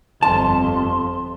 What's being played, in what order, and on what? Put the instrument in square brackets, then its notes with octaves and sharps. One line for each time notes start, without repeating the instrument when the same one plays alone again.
[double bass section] G1 F2 [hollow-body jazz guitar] A5 [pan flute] C6